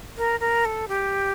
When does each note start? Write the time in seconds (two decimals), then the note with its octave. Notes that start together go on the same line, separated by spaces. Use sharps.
0.17 A#4
0.40 A#4
0.65 A4
0.88 G4